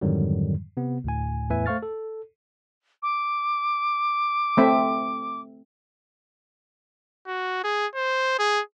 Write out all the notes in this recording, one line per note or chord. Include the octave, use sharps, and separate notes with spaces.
F2 G#2 D3 D#3 F#3 G3
C3 B3
D2 A2 G#5
E2 A2 B4 E5 G#5
A3 C5 F5 C#6 F6 A6
A4
D6
A3 C4 E5
F#4
G#4
C5
G#4